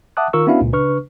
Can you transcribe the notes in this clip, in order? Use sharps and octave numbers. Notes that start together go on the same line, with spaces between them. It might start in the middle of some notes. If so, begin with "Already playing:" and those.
E5 F#5 A5 D6 D#6 F#6
D#3 F4 A#4 C#6 E6
B3 C#4 D4 E4 F#4 F5
C#2 A#2
C#3 D4 B4 C#6 F6